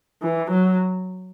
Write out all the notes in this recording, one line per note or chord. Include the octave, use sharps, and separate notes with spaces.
E3
F#3